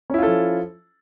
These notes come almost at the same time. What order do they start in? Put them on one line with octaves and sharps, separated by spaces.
C#4 E4 F4 A4 F3